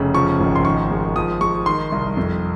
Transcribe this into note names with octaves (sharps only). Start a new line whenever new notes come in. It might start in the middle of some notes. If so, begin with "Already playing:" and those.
Already playing: F1 C#3
F3 C#6
G#1
C6
D#3 C#6
G#3
F3 D#6
G#3 C#6
D#3 C6
C2
F2